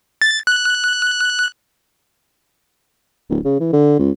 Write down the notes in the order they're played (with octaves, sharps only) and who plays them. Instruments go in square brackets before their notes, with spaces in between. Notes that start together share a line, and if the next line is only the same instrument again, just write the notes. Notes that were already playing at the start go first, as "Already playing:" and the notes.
[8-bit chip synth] A6
F#6
[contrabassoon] D1
C#3
E3
D3
C#2